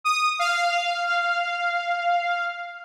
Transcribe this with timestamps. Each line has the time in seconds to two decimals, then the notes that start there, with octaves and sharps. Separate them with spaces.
0.04 D#6
0.39 F5